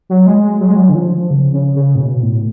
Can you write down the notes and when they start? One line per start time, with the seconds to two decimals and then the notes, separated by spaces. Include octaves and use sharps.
0.09 F#3
0.27 G#3
0.44 G#3
0.61 F#3
0.69 G#3
0.76 F#3
0.89 D3
0.95 F3
1.31 C#3
1.53 C#3
1.76 C#3
1.95 A2
2.00 B2
2.23 A2